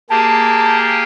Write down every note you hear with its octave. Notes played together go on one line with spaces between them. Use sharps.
A#3 G4 G#4 A5